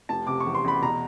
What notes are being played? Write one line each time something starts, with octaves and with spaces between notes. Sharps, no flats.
F1 A5
C3 D6
C#6
E2
C6
E2 B5
B2 A#5